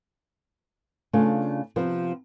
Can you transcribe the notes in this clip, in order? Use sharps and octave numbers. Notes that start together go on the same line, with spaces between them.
C#3 A3 B3 D4 F4
C3 F3 B3 C4